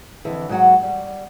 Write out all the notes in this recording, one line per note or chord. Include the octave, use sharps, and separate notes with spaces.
F2 D3 E3
G#2 F#3 F#4 F#5
G3